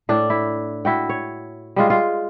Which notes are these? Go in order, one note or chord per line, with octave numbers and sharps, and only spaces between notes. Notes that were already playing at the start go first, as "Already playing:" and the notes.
A2 D4
E4
E4 F#4 G5
C#5
G3 G#3 F4
F4